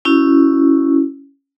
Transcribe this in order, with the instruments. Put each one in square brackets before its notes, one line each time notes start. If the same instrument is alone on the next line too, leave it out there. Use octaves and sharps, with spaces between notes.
[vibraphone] C#4 E4 F#4